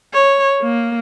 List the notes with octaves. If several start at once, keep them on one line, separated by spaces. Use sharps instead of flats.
C#5
A#3